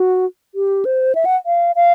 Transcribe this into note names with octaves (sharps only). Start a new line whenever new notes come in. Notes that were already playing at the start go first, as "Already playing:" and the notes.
Already playing: F#4
G4
C5
E5
F#5
F5
F5